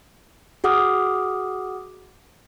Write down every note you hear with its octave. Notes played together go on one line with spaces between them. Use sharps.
F#4 G#4 F#5 D6 D#6 F6